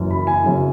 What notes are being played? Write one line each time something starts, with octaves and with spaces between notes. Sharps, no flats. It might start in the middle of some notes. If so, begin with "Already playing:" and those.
Already playing: F#1 F#2 E3
B5
G#5
F#2 C#3